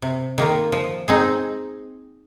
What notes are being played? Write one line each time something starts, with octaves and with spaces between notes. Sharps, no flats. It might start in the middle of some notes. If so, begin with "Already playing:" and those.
C3
D#3 A#3 F4
F3
C4 D#4 G#4